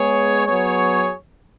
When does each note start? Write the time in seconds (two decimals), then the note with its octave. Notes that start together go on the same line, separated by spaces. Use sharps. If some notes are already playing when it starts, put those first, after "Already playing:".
Already playing: G#3 B3 G#4 C#5
0.46 F#3 B3 G#4 C#5